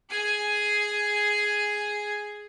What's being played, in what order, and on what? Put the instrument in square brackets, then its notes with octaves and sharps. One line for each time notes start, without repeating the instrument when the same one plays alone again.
[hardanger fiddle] G#4 G#5